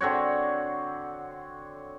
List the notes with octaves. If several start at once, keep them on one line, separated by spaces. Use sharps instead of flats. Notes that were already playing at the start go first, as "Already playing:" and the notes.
D3 C4 F#4 C#5